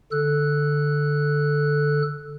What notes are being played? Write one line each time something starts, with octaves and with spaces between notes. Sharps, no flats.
D3 A4 F#6